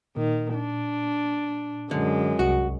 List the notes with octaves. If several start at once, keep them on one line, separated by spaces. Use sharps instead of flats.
A#2 D#3
D4
F#2 D3 G#3
C2 F#4